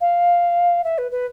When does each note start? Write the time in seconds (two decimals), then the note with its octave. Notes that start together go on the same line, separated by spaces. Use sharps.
0.01 F5
0.84 E5
0.98 B4
1.11 B4